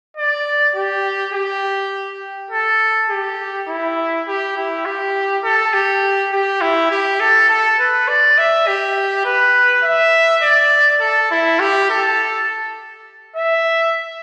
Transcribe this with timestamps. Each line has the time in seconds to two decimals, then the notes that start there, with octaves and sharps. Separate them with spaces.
0.17 D5
0.76 G4
1.34 G4
2.51 A4
3.10 G4
3.68 E4
4.27 G4
4.57 E4
4.85 G4
5.44 A4
5.73 G4
6.32 G4
6.61 E4
6.91 G4
7.20 A4
7.49 A4
7.79 B4
8.08 D5
8.38 E5
8.67 G4
9.25 B4
9.83 E5
10.42 D5
11.01 A4
11.31 E4
11.59 G4
11.89 A4
13.36 E5